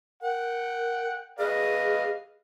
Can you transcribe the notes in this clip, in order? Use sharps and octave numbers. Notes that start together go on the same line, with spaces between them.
A#4 F#5 G5
G#4 B4 D#5 F5